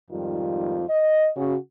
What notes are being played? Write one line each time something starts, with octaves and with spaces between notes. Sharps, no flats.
F2 G#2 D#3 G3 F4
D#5
C#3 C#4 F#4